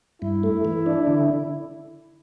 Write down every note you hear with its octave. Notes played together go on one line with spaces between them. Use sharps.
G2 E4
A3
E3
D4
D3